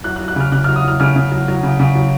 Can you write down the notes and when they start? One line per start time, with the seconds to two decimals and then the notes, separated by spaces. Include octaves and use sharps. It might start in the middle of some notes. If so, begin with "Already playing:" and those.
0.04 F#3 F#6
0.16 F#6
0.21 F#3
0.28 F#6
0.36 C#3 F6
0.52 C#3 F#6
0.64 F6
0.69 F#3
0.76 D#6
0.84 F#3 F6
1.00 C#3 F6
1.16 C#3
1.32 F#3
1.48 F#3
1.63 C#3
1.80 C#3
1.95 F#3